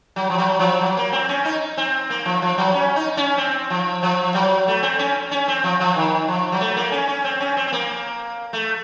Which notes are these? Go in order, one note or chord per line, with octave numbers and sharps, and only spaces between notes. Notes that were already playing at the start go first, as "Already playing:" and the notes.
F#3
F3
F#3
F3
F#3
A#3
C4
C#4
D#4
C4
A#3
F3
F3
F#3
C#4
D#4
C#4
C4
F3
F3
F#3
A3
C4
C#4
C#4
C4
F3
F3
D#3
F3
F#3
A3
A#3
C#4
C#4
C4
C#4
C4
C4
A#3
A3